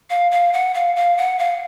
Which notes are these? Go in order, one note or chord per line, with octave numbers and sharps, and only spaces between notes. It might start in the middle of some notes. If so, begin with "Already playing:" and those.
F5
F5
F#5
F5
F5
F#5
F5